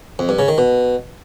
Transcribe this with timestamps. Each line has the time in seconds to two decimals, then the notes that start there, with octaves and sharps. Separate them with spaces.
0.19 F2
0.29 G2
0.39 C#3
0.48 D#3
0.58 B2